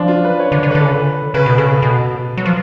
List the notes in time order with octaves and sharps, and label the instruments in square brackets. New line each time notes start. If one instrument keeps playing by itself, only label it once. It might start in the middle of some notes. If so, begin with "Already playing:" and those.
Already playing: [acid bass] F3 [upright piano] D4
[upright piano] F4
B4
C#5
[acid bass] D3
[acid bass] D3 [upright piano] C#5
[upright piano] B4
[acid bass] D3
[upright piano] A4
[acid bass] C#3 [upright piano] B4
[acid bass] D3
[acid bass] C#3 [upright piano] B4
[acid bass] B2
[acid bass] C#3 [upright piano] A4
[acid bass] B2
F#3
F3